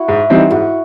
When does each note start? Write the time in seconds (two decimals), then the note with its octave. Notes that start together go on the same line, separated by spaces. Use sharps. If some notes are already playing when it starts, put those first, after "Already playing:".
Already playing: E4 F#4
0.08 G#2
0.30 E3 G3 C4 D#4
0.51 G#2 E4 F#4